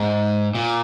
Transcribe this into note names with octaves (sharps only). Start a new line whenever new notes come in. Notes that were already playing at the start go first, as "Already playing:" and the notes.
Already playing: G#2
A#2